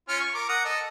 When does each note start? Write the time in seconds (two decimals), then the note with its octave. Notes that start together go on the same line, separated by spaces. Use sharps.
0.09 C#4 F4 F6
0.21 C#6
0.35 A#4 D6
0.49 F#5 A#5 D#6
0.64 A4 D#5